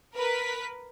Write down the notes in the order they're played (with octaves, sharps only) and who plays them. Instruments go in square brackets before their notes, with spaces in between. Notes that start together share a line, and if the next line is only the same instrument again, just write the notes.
[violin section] A#4 B4 B6